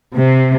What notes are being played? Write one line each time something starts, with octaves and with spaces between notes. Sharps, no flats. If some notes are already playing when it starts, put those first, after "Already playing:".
C3